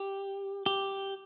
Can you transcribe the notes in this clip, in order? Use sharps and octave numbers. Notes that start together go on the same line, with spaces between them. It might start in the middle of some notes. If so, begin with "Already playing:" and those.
Already playing: G4
G4